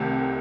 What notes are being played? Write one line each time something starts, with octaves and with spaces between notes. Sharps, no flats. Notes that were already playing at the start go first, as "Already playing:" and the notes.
Already playing: C2 C3 D#3 A3